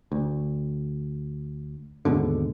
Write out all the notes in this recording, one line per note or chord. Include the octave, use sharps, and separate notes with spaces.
D2
D#2 G#2 B2 D3